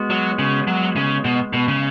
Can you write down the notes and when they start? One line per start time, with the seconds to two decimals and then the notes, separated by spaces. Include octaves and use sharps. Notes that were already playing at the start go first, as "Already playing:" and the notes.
Already playing: G#3 B3 F#4
0.10 F#3
0.39 C#3
0.68 F#3
0.96 C#3
1.25 B2
1.53 B2
1.68 C#3